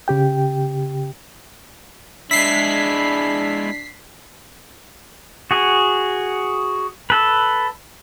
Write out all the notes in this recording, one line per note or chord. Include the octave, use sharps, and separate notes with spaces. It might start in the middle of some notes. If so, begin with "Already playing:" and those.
C#3 G4 G5
G#3 D4 E4 B6 C7
F#4 G#4
A4 B4